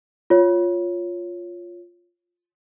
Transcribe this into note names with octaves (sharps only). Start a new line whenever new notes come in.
F4 C#5